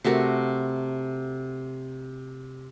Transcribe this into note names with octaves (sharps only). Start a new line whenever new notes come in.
C3 A3 F#4 A#4